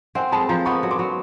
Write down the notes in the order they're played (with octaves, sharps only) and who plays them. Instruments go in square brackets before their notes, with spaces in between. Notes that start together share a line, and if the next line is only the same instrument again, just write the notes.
[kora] C4 [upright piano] F#5 G#5
[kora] G#3 [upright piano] A5 B5
[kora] F3 [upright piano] A#5 C6
[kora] B3 [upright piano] B5 C#6
[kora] F#3
[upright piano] C6 D6
[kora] F#3